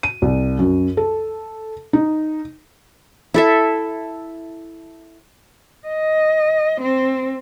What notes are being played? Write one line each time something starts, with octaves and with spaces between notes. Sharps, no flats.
D#7
C2
F#2
A4
D#4
E4 A4 E5
D#5
C4